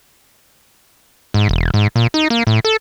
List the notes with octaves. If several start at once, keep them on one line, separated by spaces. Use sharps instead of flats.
G#2
E1
G#2
A#2
D#4
A#3
A2
A4